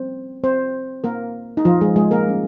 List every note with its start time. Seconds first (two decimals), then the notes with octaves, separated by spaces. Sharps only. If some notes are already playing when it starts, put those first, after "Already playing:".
Already playing: G3 A#3 C4 C#4 C5
0.44 C4 C5
1.04 A#3 A#4
1.57 D#4
1.65 F3 F4
1.81 G#3 G#4
1.96 G#3 G#4
2.11 A#3 A#4
2.27 G3 C#4